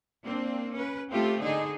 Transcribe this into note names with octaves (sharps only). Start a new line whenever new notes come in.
A#3 C4 D4
C#4 B4
A3 C4 F4 G4
D3 D#4 G#4